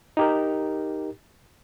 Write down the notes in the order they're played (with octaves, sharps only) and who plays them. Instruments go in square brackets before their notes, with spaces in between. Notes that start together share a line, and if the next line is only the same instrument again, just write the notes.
[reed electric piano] D#4 G4 A#4